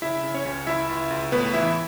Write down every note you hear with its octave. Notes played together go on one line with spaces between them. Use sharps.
C#3 E4 E5
C#3
C#4 C#5
C#2
C#2 E4 E5
C#2
C#2
A2 B3 B4
E3 E4 E5